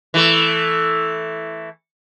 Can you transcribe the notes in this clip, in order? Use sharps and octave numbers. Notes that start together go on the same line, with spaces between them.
E3 A3